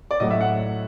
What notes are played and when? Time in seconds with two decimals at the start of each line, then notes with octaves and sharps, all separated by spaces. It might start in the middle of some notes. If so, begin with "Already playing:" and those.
0.11 D5
0.20 A2 F#3 D#5
0.31 E5
0.41 F#5